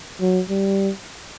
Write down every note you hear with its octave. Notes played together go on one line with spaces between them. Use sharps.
F#3
G3